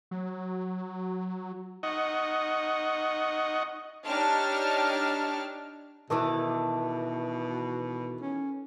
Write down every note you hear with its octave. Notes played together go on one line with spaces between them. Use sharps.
F#3
D#4 D#5 F#5 C#6
D4 D#4 G4 C#5 A5 F6
B2 D#3 E3 A4 D6
C#4